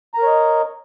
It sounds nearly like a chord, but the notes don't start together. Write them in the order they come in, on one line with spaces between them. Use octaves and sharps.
A#5 A#4 C#5 D#5